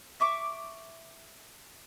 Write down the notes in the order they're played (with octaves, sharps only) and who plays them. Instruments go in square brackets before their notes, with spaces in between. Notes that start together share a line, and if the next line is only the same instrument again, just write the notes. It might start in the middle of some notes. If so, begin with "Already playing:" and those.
[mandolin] E5 C#6 D6